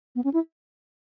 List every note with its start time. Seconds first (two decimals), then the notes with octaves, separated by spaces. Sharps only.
0.15 B3
0.24 C#4
0.33 E4